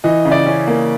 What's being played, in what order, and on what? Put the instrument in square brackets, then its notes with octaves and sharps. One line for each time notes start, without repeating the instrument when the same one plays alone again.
[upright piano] E3 D#5
C#3
D5
C#4
A#3